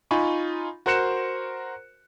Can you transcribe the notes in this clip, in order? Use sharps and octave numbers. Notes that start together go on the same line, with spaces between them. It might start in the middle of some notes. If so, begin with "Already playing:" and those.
D#4 F4 G#5 B5 C#6
F#4 A#4 C5 F#6 C#7 E7